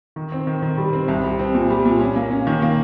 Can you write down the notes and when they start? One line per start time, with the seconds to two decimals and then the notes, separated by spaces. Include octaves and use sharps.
0.16 D#3
0.32 C4
0.47 D#3
0.62 D#3
0.78 G3
0.93 C4
1.08 C2
1.24 G3
1.39 C4
1.55 A#2
1.70 G3
1.85 A#2
2.01 C#4
2.16 A#3
2.31 C#4
2.47 D#3
2.62 A#3